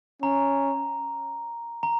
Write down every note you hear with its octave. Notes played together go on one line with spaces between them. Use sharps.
C#4 A#5
A#5